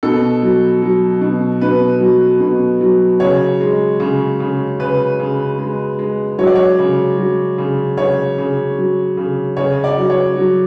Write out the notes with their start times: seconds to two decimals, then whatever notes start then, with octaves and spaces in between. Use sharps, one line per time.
0.03 B2 A4
0.42 F#3
0.82 F#3
1.21 B2
1.61 B2 B4
2.01 F#3
2.40 B2
2.81 F#3
3.20 C#3 C#5
3.61 G#3
4.00 C#3
4.40 C#3
4.80 C#3 B4
5.20 C#3
5.59 G#3
5.99 G#3
6.38 F#3 C#5
6.47 D5
6.55 C#5
6.79 C#3
7.18 F#3
7.58 C#3
7.97 C#3 C#5
8.38 C#3
8.78 F#3
9.17 C#3
9.57 C#3 C#5
9.84 D5
9.97 F#3
10.10 C#5
10.36 F#3